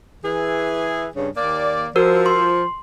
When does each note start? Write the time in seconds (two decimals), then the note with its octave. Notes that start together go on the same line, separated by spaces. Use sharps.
0.25 E3 G#4
1.16 G2 C#3
1.36 D#2 A#3 D5
1.96 F3 F#4 A#4 E6
2.26 C6